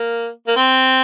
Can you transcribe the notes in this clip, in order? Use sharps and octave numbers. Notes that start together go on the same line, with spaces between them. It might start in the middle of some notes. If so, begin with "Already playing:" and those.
Already playing: A#3
A#3
C4